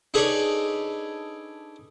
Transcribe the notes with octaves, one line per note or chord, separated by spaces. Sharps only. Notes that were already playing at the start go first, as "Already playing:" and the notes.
D4 D#4 G#4 A4 B4 C#5